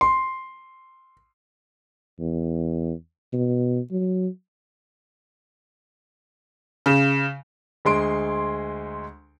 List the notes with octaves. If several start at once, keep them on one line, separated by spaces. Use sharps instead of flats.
C6
E2
B2
F#3
C#3
D2 G#3 C6 D7